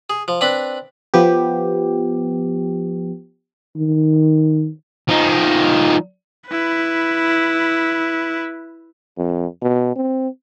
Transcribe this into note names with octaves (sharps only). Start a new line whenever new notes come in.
G#4
F3
C4 D4 B4 B5
F3 B3 G4
D#3
F3 D#4
E4 B4
F2
B2
C4